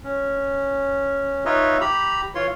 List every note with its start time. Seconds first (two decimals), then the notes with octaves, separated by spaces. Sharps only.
0.04 C#4
1.45 D#4 F4 B4 C#5 D#5 E5
1.81 G4 A#5 B5
2.35 E3 F4 C#5 C6